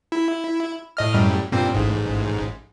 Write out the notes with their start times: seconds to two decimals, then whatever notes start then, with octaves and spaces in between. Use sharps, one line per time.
0.12 E4
0.97 A2 D#5 F6
1.14 F#2 A2 G3
1.52 G2 A#2 C4
1.74 A1 G#2